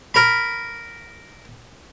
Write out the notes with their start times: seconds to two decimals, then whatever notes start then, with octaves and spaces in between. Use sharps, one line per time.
0.14 A#4 B5